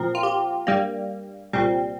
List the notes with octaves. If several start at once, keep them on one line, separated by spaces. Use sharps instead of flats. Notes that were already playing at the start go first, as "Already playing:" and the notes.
Already playing: A#2 F3 C4 A#4
F4
G4
G2 G3 A#3
C2 A#2 G3 C4